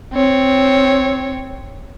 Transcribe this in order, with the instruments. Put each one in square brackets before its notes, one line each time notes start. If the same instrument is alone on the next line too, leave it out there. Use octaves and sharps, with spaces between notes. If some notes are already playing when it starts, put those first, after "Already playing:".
[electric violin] C4 C#5